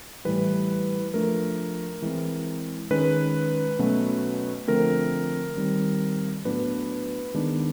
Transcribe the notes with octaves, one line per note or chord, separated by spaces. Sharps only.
A2 E3 G3 B4
F3 A3 D4 A#4
E3 G#3 C4
D#3 G#3 C#4 B4
B2 F#3 A3 C#4
D3 F3 A3 C4 A#4
D#3 G3 C4
A2 F#3 B3 D4 B4
D#3 G#3 B3 D4